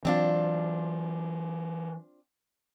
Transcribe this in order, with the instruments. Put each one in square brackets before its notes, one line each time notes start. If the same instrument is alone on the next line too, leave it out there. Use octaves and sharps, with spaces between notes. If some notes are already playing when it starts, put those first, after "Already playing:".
[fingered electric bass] E3 F#3 [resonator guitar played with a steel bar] C4 D4 F4